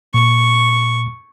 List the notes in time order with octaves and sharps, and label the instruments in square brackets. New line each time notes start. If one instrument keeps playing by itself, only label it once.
[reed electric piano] A#2 [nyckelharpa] C#6